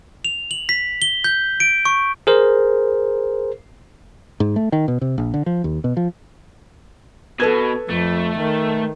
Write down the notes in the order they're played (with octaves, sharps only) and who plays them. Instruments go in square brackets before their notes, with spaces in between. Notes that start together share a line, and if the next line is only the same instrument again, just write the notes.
[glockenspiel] F7
F#7
B6
G7
G6
D7
C#6
[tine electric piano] G#4 A#4 C5
[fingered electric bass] G#2
A3
D#3
B2
C3
A#1
D3
F3
D#2
B2
F3
[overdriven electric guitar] B2 [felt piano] A4 B4 G#6
[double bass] F2 [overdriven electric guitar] A3
[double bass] D#3